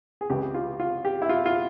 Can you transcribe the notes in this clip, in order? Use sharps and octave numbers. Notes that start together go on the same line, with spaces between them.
G#4
C#2 C3 E3 G4
F4
F4
G4
E4
F4
F4